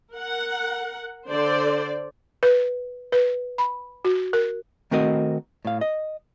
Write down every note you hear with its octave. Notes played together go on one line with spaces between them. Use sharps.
A#4 F#5
D3 C5 D5
B4
B4
B5
F#4
A#4
D#3 A3 C4 F#4 A#4 D#5
A2 F5
D#5